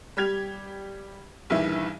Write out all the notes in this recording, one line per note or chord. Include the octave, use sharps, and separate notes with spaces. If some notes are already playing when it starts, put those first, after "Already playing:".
G3 G4 G#6 F7
A#1 G2 D#3 E3 E5